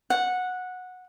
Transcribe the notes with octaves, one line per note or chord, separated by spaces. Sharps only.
F#5